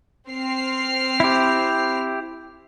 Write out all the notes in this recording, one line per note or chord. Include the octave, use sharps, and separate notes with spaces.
C4 F6 C7
E4 G4